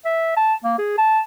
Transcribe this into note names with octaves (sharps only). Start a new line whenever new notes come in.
E5
A5
A#3
G#4
A5